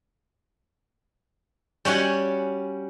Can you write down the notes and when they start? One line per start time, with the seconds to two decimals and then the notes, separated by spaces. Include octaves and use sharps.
1.85 G3 C#4 F#4 F#5 G#5